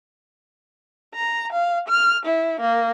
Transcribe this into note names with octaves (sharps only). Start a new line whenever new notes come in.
A#5
F5
F6
E4
A#3